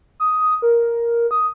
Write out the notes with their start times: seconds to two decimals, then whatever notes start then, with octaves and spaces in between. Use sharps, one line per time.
0.20 D#6
0.62 A#4
1.31 D#6